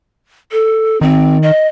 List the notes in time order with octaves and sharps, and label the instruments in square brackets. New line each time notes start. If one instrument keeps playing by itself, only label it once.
[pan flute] A4
[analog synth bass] D#3 [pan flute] C4
[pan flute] D#5